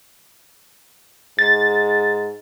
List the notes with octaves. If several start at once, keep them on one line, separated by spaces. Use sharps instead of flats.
G#2 A6